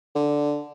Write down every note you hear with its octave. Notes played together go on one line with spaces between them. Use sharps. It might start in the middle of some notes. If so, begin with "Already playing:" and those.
D3